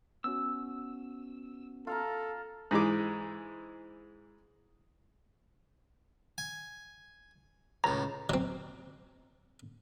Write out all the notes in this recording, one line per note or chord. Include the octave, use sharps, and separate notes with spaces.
B3 C#4 F#4 E6
F4 A4 F5 A#5
G#2 E3 G#3 D6
G#5
C#2 A2 A#5
F#3 C4